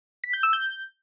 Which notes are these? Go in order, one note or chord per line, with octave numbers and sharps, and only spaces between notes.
B6
G6
E6
G6